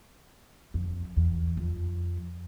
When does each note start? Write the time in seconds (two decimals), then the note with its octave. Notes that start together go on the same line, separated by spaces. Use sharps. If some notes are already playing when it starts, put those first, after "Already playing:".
0.74 F2
1.17 E2
1.57 F2